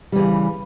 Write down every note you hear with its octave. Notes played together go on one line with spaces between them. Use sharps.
C#3 E3 G3